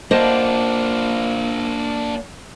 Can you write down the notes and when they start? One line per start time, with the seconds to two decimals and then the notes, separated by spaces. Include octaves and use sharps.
0.11 A#3 D4 F4 C5 D#5 F#5 A5